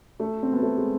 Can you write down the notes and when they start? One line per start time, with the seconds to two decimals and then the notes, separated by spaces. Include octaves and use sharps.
0.20 A3
0.43 C4
0.53 B3
0.63 A3
0.77 G#3